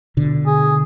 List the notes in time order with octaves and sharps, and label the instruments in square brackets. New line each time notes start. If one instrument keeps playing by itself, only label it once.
[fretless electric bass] B2 D3
[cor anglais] G#4